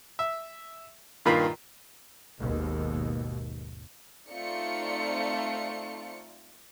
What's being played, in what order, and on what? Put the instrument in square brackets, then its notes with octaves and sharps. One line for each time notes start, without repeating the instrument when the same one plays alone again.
[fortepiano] E5
G2 A#2 D#3 F4 B5
[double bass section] G#1 D#2 B2
[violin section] A3 C4 D#4 F4 D5 C#7